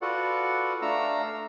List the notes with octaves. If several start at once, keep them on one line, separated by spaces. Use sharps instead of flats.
F4 F#4 A4 B4 D5 F#5
A3 D4 F5 A#5 E6